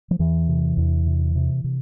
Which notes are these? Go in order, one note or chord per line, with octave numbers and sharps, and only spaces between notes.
F3
E2 E3
C3
E2
C3
C3
C3